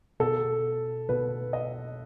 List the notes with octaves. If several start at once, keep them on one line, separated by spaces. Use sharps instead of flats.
B2 A4
B2 B4
D#5